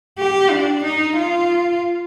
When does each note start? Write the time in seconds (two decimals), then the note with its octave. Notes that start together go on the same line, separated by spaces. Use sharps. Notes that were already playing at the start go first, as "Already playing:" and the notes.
0.18 G4
0.50 D4
0.84 D#4
1.17 F4